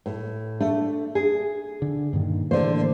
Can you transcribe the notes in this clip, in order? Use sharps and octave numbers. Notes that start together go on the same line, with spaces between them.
A2
A3 D4
G#4
D3
G2 A#2 D#3
A2 D3 E3 A#3 C5